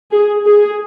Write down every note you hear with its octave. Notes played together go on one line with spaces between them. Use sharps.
G#4
G#4